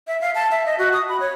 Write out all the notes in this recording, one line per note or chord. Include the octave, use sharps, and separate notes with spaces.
E5
F5
A5
E5
D#5
F#4
D#6
B5
C#5